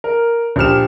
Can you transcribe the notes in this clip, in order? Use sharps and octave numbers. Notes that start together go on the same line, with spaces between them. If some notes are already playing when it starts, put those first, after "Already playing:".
A#4
A#1 G4 F6 E7